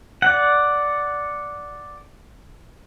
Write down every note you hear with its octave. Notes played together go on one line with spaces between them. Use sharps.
D5 F#5